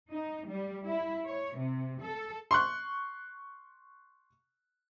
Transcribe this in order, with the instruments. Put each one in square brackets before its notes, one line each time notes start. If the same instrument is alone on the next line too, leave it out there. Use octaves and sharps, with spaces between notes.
[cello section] D#4
G3
E4
C#5
C3
A4
[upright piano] C6 C#6 F#6